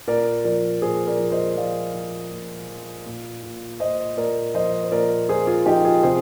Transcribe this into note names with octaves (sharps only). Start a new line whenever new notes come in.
A#2 A#4 D5
F3 A#4 D5
A#2 G#4 C5
A#4 D5
F3
C5 D#5
F3 D5 F5
F3
A#2
F3
A#2
A#2
A#2 C5 D#5
A#2 A#4 D5
F3 C5 D#5
C5
A#2 A#4 D5
F3 G#4 C5
F4 G#4
F3 D#4 G4
F4 G#4
C3 G#4 C5